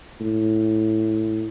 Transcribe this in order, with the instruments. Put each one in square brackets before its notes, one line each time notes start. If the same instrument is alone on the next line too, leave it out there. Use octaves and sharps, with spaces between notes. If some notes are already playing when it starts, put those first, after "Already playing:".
[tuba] A2